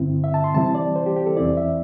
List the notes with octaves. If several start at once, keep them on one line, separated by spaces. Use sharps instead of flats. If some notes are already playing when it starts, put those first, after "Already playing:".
Already playing: G2 D3 C4 E4
E5
A5
C6
C3 E3 G3 C4 E4 A5
D5
C5
G4
G4
A4
E2 E3 C4 E4 D5
E5